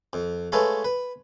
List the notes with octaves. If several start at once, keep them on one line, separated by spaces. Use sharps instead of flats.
F2
G#3 A3 A4 B4 C#5 F5
B4